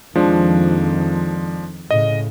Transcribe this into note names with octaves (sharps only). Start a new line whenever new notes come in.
F2 D#3 F3 G#3 D4
A2 C#3 D#5